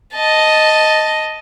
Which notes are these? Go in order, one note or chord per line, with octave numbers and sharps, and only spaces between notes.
D#5 A5